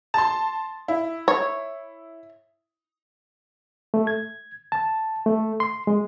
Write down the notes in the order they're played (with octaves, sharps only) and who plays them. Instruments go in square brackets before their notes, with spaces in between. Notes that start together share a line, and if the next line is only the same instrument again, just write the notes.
[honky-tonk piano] A5 C6
E4
[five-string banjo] C#5
[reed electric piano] A3
G#6
A5
A3
C6
G#3